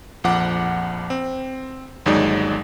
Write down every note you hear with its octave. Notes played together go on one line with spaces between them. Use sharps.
A#1 F2 F3 F#5 D6
C4
G1 D#2 F#3 G#3 D#4 D5